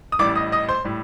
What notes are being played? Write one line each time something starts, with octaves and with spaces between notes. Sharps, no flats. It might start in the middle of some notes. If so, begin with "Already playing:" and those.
D#6
A1 A2 G3 D5 D6
D#5 D#6
D#5 D#6
C5 C6
A2 G3